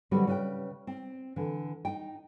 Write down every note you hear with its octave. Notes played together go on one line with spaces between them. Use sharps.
D3 F#3 G3 C4 G4 B4
C#3 G3 B4 D5 G5
C4
D3 E3
D#4 G5